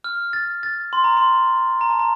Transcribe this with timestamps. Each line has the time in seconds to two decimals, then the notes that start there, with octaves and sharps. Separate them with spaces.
0.04 F6
0.33 A6
0.63 A6
0.93 C6
1.04 A#5
1.17 C6
1.81 A#5
1.90 A5
1.99 A#5